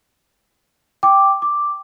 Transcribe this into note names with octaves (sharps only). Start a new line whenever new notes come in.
G5 D6
D6